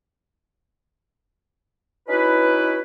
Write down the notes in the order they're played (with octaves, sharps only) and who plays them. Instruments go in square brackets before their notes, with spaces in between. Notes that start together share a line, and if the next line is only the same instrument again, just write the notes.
[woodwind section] C#4 D#4 E4 F#4 B4